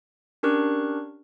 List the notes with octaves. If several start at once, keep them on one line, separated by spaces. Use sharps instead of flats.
C#4 D4 G4 A#4 C#6 F#6